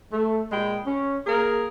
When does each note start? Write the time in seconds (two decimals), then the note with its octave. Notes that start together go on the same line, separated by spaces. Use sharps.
0.13 A3
0.52 A#2 G#3 G5 B5
0.85 C#4
1.27 A#3 G#4 A#4